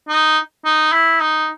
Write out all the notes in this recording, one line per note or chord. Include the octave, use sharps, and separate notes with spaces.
D#4
D#4
E4
D#4